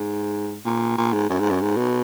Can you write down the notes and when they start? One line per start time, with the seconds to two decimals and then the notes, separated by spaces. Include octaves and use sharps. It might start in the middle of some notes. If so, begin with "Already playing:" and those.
Already playing: G#2
0.65 A#2
0.98 A#2
1.13 G#2
1.30 F#2
1.39 G#2
1.50 F#2
1.61 G#2
1.77 B2